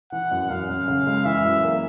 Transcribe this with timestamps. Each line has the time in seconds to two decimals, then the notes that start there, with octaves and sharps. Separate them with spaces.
0.12 E3 F#5
0.31 F#2
0.50 F#2 F5
0.69 F#2
0.88 C#3
1.06 G#3
1.25 E3 E5
1.45 F#2
1.64 A#3